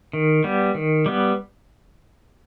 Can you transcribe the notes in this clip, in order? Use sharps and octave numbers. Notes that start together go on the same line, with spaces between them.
D#3
G3 B3
D#3
G3 B3